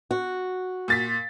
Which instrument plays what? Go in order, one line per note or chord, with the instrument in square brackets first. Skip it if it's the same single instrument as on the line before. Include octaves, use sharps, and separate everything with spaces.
[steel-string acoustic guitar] F#4
[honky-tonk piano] A#2 A6 B6